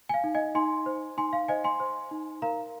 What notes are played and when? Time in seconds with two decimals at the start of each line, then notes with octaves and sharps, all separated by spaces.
0.09 G#5
0.14 F5
0.24 D#4
0.34 D#5 G#5
0.55 D#4 G#5 C6
0.86 C5
1.17 D#4 G#5 C6
1.33 F5
1.48 C5 D#5 G#5
1.64 G#5 C6
1.80 C5
2.11 D#4
2.42 A#4 F5 A#5